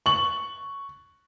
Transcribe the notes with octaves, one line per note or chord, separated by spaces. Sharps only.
C#6 F#7